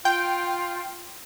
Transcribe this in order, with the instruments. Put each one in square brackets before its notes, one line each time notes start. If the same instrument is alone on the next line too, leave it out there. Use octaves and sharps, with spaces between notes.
[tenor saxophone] F4 [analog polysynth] G5